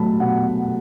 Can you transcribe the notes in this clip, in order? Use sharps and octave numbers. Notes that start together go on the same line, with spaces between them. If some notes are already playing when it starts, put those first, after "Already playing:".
Already playing: B2 F#3 A3 A5 B5
B2 F#5